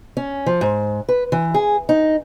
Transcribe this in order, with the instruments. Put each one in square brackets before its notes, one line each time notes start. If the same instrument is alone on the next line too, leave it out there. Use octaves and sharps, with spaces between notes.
[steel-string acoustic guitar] C#4
F3
G#2
B4
E3
G#4
D#4